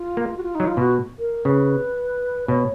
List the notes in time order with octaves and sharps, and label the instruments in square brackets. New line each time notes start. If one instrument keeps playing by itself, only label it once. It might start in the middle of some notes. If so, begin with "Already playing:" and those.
Already playing: [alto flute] F4
[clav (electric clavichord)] A#3
[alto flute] F#4
F4
D#4
[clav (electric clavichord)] F#3
[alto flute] F4
[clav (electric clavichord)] B2 [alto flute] F#4
[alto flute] A#4
[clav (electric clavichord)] C#3 [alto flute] B4
[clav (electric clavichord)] B2 [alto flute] C#5